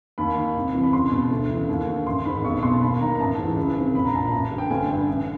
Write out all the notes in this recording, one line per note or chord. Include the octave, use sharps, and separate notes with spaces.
D#2 B5
D#3
C2
C3 E3
B5
C#2 C6
B2
D2
C#3 E3
D#2
D3
A1 C6
G#2 D#3 B5
B1 C#6
B2 C6
D#2 B5
D#3 A#5
A#5
A1 A5
G#2 E3
C#2
C3 D#3
A#1 B5
A#5
A#2 A5
A#5
A1
G2 D3
G5
G1 G#5
G2 D3
A1